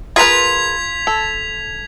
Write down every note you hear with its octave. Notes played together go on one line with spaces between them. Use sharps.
F4 G#4 A#4 B4 G#6 B6 F7
A4